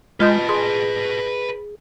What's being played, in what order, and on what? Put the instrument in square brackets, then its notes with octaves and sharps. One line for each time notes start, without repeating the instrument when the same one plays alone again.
[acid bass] G#3 [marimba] F4 D#5 G6 [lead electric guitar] B4 A5
[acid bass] G#4 [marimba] C6